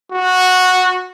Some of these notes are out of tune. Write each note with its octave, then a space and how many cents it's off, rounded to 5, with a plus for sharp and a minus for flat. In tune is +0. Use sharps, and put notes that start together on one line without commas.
F#4 -10